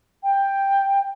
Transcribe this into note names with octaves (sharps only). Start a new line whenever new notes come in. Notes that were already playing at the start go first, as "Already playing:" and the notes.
G5